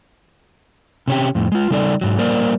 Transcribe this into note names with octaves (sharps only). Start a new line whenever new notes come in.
C3 C#4 G4
F2 A2
G#3 F4
C#3 G3 D#4 A4 C5 D5
G#2 F#3
G3 A#3 A#4 C5 D5